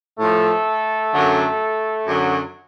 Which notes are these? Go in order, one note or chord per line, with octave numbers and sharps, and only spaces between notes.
A2 F3 A3 A4
F#2 D3 F#3
F#2 D3 F#3